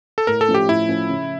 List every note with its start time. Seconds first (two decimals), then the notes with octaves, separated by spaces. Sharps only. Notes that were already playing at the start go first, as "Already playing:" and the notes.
0.18 A4
0.27 A2 A#4
0.41 A4
0.48 F3 A3 C#4
0.54 G4
0.68 A2 E4
0.88 F3 A3 C#4
1.09 C#3